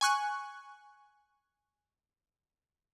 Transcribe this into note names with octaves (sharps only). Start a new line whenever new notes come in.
G#5 C#6 F#6